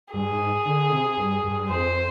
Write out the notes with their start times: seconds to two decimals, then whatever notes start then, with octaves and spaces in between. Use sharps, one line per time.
0.14 G2 G#4
0.31 G#2
0.65 D3
0.92 C3
1.17 G2
1.44 G2
1.69 F2 C5